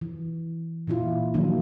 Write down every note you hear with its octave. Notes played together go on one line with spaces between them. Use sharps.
E3
A#2 E3 E4 F4
D#3 F3 F#3 A#3 D4 D#4